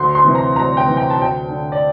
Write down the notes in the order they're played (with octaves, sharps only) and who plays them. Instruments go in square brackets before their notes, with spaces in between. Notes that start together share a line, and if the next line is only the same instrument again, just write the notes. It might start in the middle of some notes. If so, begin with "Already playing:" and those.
Already playing: [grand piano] D2 C6
C6
C3 E3
A#5
D2 A#5
G5
C3 E3
G5
A5
D2 G5
D3
D5